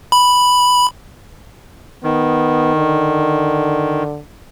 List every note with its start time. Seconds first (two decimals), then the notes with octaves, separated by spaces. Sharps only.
0.12 B5
2.03 D#3 B3
2.76 D3